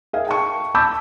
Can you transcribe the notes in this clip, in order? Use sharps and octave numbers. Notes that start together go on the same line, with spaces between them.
G#4 A#4 E5 F5
G5 A5 C#6
A5 B5 D6 E6 G6